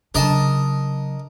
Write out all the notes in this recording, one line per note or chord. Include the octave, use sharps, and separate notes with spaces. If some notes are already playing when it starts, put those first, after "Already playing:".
C#3 F#3 D4 A#4 D#5 A5